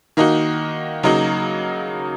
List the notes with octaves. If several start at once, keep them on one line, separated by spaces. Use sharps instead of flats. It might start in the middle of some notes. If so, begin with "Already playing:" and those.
D#3 A#3 D#4 F#4
C#3 F#3 A#3 D#4 F#4